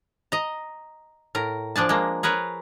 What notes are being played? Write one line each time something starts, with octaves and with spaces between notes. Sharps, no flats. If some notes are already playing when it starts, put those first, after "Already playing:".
D#5 A#5
A2 A#4
F3 D4 G#4 A5
G#3 A#3
G#4 A#4 B4 C#5